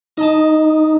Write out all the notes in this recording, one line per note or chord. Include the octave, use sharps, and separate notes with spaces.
D#4 D#5 A5